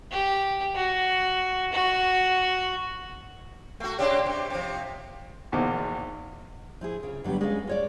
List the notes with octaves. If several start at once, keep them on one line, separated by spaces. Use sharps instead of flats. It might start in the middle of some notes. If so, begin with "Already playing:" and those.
G4
F#4
F#4
A3 F#4
C3 D4 G4
C3
C3 F3
A#1 E2 B2 D#3 C5 D6
F3 E4 G#4
C#3 F4
D3 F#3 G3 B3 G4
G#3 C#4 F#4 A4 E5 F5
F4 C#5 D5